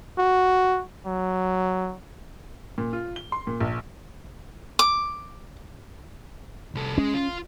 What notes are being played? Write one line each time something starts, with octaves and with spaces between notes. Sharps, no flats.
F#4
F#3
A#2
F4
G7
C6
A#2
A#1
D6
C2 A4
G#3 C#4
F4